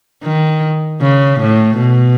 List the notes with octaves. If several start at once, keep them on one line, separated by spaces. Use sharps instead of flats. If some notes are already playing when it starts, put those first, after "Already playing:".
D#3
C#3
A2
B2